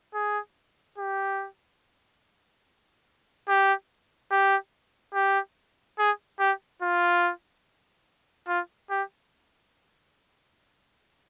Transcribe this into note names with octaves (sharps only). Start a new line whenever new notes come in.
G#4
G4
G4
G4
G4
G#4
G4
F4
F4
G4